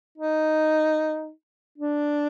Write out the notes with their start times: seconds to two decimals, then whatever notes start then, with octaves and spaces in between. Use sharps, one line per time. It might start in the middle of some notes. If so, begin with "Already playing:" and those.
0.18 D#4
1.78 D4